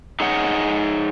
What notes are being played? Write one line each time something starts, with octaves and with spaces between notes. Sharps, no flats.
D#4 G#4 C#5 F#5